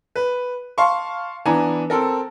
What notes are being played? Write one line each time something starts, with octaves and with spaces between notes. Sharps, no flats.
B4
F5 A5 C6 C#6
E3 B3 D4 G#5 A#5
C4 A4 A#4